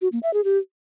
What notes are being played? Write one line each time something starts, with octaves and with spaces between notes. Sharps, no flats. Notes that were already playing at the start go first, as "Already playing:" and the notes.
F#4
A#3
E5
G#4
G4